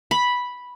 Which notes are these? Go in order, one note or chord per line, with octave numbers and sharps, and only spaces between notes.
B5